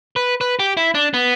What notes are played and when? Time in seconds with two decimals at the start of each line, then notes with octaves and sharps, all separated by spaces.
0.16 B4
0.41 B4
0.59 G4
0.77 E4
0.95 D4
1.14 B3